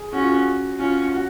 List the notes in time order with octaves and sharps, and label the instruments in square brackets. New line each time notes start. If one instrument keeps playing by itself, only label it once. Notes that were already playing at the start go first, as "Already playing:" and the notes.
Already playing: [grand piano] G#4
[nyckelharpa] C#4 [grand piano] F#4
[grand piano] F4
F#4
[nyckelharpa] C#4 [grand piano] F4
[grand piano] F#4